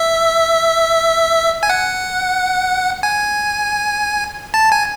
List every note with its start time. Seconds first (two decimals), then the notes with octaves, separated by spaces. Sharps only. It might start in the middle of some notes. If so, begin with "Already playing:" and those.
Already playing: E5
1.63 G#5
1.69 F#5
3.03 G#5
4.54 A5
4.72 G#5